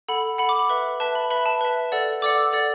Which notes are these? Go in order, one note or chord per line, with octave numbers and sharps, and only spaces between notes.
A4 F#5 B5
A4 F#5 B5
D6
B5
B4 E5
B4 E5 A5
B5
B4 E5 B5
A5
B4 E5
A4 D5 F#5
A4 D5 F#5 D6
E6
A4 D5 F#5